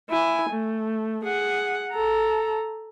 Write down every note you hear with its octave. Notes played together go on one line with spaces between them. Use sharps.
E4 G#5
A3
G#4 F#5
A4 A#5